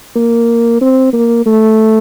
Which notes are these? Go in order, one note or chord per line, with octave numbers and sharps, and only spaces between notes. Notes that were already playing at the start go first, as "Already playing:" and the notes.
A#3
C4
A#3
A3